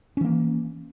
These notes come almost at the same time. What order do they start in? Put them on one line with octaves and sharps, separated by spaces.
C#4 E3 A#3